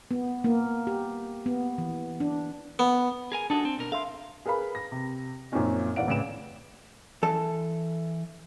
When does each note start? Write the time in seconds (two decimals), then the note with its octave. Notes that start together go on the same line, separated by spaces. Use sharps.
0.11 B3
0.44 A#3
0.87 G4
1.46 B3
1.78 E3
2.20 D4
2.79 B3
3.32 G#4 A#4 G#5
3.50 D4 F#4 G#4 A4 A5
3.65 C4
3.79 B2 A#4
3.92 A4 E5 F5 C6
4.46 G#4 A#4 B4 F5 B5
4.75 A#6
4.92 C3
5.52 F#2 A#2 F3 C4 C#4 D#4
5.96 D#1 E3 D5 F5 F#5 D7
6.08 A1 C#3 B4 D7 E7
7.23 E3 A4 A5